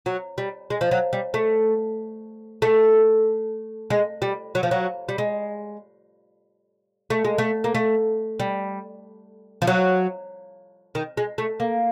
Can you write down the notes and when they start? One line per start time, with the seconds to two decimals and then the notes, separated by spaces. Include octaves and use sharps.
0.06 F#3
0.38 G3
0.70 G#3
0.81 F3
0.91 F#3
1.13 G3
1.34 A3
2.62 A3
3.90 G#3
4.22 G3
4.55 F#3
4.63 F3
4.71 F#3
5.09 G3
5.18 G#3
7.10 A3
7.25 G#3
7.38 A3
7.64 A#3
7.75 A3
8.40 G3
9.62 F3
9.67 F#3
10.95 D#3
11.17 G#3
11.38 A3
11.60 A#3